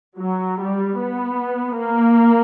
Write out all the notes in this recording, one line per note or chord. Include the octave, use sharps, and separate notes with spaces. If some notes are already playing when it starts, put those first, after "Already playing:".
F#3
G3
B3
A#3